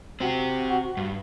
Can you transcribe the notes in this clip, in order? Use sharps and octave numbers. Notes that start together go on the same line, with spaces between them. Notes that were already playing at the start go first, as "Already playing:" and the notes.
C4 F#4 G4
G2